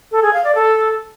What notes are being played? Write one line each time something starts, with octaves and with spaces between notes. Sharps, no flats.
A4
G#4
F5
D5
A4